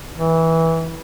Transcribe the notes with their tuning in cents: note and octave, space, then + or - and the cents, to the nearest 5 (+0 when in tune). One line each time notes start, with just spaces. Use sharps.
E3 -15